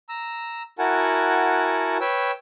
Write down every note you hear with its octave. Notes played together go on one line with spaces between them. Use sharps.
A#5 E6
E4 F#4 A#4 F#5 G#5 A5
B4 C#5 G5 E6